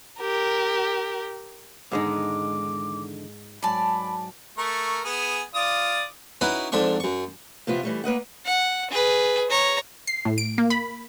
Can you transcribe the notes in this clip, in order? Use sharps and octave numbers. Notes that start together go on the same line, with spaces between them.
G4 A#4
E2 G#2 D3 D#3 G#3 D#4 D6
G#2 F#3 D5 G#5 A5 B5
A3 A#4 C#6
B3 G#4 G#5
F4 D5 D#6
C#4 D#4 E4 F#4 B4
F2 G#2 D4 E5 C#6
F#2 C#6
F2 C3 E3 F3 B3 F4
E3 G3 A3
A#3 B4 D#5 F#5
F#5
G#4 B4
C#5 A#5
C7
A2
D7
A#3
B5